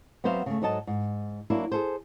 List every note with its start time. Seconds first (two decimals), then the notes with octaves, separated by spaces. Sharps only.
0.24 F#3 B3 C4 C5 E5 F5
0.46 C#3 A3
0.62 G#2 F#3 A4 D#5 A5
0.87 G#2
1.50 F#3 A#3 D4 E4
1.72 G#4 A4 C5